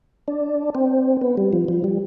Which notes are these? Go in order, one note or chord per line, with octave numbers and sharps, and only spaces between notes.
D4
C4
B3
G3
F3
F3
G3